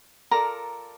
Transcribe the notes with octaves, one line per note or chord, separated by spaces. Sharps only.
F4 A4 A#4 D5 A#5